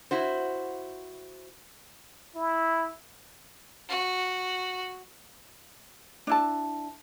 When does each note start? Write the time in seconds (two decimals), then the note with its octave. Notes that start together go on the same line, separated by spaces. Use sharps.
0.11 E4 F#4 C5
2.35 E4
3.89 F#4
6.27 D4 E4 A5